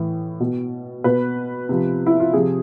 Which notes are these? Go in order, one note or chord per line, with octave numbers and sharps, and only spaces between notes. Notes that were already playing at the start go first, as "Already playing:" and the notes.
Already playing: A2 E3
B2
B2 B4
C3 F3
E4
F4
C3 F3 G#4